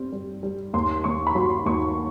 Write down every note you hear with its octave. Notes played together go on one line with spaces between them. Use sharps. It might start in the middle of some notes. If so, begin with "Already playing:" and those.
Already playing: G3 C4
G3
G3
D#2 C6
D#2 C#6
B5
F#3 C6
D#2 C#6